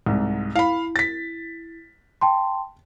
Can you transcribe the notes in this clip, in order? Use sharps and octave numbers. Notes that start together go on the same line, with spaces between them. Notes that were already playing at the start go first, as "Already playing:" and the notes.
C2 G#2
E4 F5 B5
A6 B6
G5 A5 C6